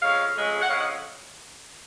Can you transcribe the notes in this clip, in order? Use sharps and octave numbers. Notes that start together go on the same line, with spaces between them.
F2 C#3 G#3 C#5 F5
F2 C#3 G#3
F#5
F2 C#3 G#3 C#5 F5
D#5 F#5